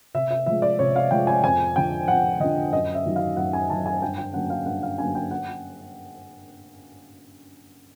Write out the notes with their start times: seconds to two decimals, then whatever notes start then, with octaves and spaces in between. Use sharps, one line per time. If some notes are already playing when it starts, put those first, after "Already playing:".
0.14 C3 E5
0.31 E5
0.46 F3 G#3 E5
0.62 D5
0.79 C3 C#5
0.96 F5
1.11 F3 G#3 G5
1.27 G#5
1.44 F2 G#5
1.76 D3 F3 G5
2.08 F2 F#5
2.40 D3 F3 D#5
2.72 F#2 D#5
2.95 E5
3.05 D#3 F#3
3.16 F5
3.37 F#2 F#5
3.53 G#5
3.70 D#3 F#3 A5
3.86 G#5
4.02 G2 G5
4.18 G5
4.34 D3 F#3 A#3 C#4 F#5
4.50 F5
4.66 G2 F#5
4.83 F5
4.98 D3 F#3 A#3 C#4 G#5
5.15 G5
5.31 F#5